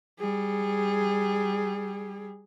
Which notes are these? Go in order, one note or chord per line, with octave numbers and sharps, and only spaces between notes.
G3 G#4